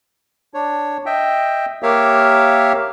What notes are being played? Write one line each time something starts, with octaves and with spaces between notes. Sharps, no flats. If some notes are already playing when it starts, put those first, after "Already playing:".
D4 C#5
D#5 E5 G5
A#3 G4 A#4 C#5 E5 F5